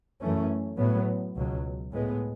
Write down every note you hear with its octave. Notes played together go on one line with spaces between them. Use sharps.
F#2 E3 A3 C#4
A2 F#3 B3
C#2 B2 F#3
A2 G#3 B3